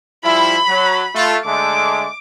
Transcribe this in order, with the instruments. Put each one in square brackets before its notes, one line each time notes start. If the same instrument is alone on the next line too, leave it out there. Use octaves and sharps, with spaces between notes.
[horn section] F3 G3 E4 [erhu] B5
[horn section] F#3
A3 F4
[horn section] D3 G#3 A3 [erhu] D6